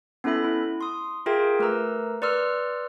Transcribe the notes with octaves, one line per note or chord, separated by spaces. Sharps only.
B3 C#4 E4 A4 E5 B5
E4
C6 D#6
F4 G#4 A#4 E5 G5 G#6
A3 A#4 B4 A#5 E6
B4 D5 C6 E6 F6